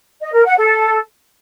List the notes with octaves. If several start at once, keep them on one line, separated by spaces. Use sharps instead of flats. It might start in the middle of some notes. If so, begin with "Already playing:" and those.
D#5
A#4
F#5
A4